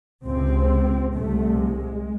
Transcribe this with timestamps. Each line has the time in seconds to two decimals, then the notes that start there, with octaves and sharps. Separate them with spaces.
0.23 C#2 C3 C4
1.12 C2 C3 A3
1.58 G#3